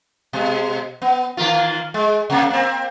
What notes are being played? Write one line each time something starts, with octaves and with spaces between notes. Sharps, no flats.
B2 G#3
B3
D#3 A#3 F4
G#3
C3 A#3
A#3 C4